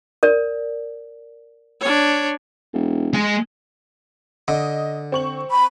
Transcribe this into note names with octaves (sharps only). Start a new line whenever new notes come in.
A#4 D5
D4 C#5
E1
G#3 G#5
D3 D#5
C4 C#6 F#7
B5